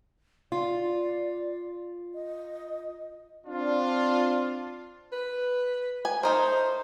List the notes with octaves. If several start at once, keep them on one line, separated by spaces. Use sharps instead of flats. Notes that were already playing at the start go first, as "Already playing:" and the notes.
F4 D5
D#5
C4 D4 F4
B4
G#5
A3 D#4 A#4 C5